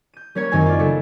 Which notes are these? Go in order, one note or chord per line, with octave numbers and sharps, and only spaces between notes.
G6 D#7
G3 A#3 C#4 C#5 G#6 C#7
F#2 D#3 C4 C#5 G#5
F4 D5
C#3 F#3 A3 G#4 A4